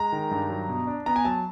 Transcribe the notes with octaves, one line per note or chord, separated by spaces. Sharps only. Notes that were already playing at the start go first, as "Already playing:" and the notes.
Already playing: G#3 A#5
D#3
G2
F#3
B2
D4
B3 A#5
G#5
F#3 A5